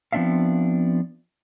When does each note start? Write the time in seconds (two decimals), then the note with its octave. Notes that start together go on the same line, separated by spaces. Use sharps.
0.12 F3 B3 C4 D4 E5 F5